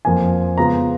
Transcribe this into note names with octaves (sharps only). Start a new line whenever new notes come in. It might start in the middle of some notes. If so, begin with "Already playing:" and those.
F2 F3 A#3 F4 G#5
C#3 G#3 B3 F4 A#5